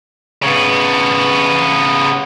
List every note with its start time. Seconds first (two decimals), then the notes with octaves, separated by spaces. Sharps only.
0.43 C#3 B3